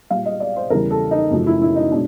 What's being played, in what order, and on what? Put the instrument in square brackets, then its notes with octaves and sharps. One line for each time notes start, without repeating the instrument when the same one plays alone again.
[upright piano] A#2 G3 F5
D#5
D5
C5
E2 C#3 E3 G3 A#4
A4
D#4
F#2 C#3 F3 A3
E4
E4
D#4
B2 G#3 D4